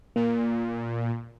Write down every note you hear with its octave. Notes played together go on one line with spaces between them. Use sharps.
A#2 A#3